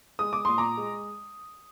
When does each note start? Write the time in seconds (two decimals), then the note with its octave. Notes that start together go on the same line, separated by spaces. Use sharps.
0.19 G#3 D#6
0.33 D6
0.45 A#2 C6
0.58 A#5 D6
0.77 G#3